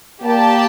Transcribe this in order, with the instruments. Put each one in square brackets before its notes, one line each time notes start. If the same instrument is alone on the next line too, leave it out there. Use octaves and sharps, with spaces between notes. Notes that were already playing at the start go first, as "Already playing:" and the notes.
[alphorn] A#3 [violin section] G4 D5 A5